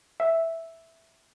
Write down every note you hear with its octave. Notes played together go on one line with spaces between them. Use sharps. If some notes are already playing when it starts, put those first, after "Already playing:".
E5